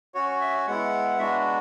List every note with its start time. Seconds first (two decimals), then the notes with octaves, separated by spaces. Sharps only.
0.14 C#4 F#4 C#5
0.40 E5
0.67 G#3 B3 E4 F#5
1.19 G#3 B3 D4 F#4 E5